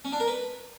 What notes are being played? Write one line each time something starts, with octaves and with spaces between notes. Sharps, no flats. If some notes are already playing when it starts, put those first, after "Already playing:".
C#4
D4
A#4
B4